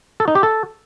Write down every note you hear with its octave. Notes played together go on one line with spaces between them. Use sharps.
A4
D#4
G4
A4